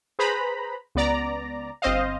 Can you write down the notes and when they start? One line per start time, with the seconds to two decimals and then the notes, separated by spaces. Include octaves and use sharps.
0.19 G#4 B4 C5 A#5 B5
0.95 C#2 B3 D5 A#5
1.82 G1 C4 C5 D#5 F5